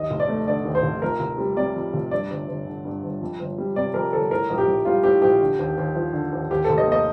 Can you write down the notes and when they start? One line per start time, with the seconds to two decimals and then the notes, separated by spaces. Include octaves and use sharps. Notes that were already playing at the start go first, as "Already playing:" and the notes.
Already playing: D#2 D#5
0.11 F1
0.20 D5
0.28 A3
0.47 D3 D5
0.65 D#2
0.75 C5
0.83 F1
1.02 F2 A#4
1.20 F1
1.38 G3
1.57 C3 D5
1.76 F2
1.94 F1
2.11 G2 D5
2.30 G1
2.48 G1
2.66 D3
2.85 G2
3.03 G1
3.21 F2
3.40 G1
3.58 G3
3.76 C3 D5
3.94 F2 A#4
4.13 G1 A4
4.31 A2 A#4
4.50 A#1
4.58 G4
4.67 A#1
4.85 G3 F4
5.04 A2 G4
5.22 A#1 G4
5.41 D3
5.59 D#2
5.78 D#2
5.95 F3
6.13 D3
6.32 D#2
6.51 D#2 G4
6.65 A4
6.69 F1
6.78 D#5
6.87 A#3
6.92 D#5